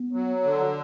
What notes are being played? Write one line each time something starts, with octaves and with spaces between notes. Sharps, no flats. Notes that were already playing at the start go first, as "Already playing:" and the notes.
Already playing: B3
F#3
D3